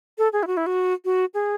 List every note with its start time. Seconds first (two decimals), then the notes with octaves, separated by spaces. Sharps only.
0.18 A4
0.33 G#4
0.43 E4
0.47 F#4
0.57 E4
0.66 F#4
1.05 F#4
1.34 G#4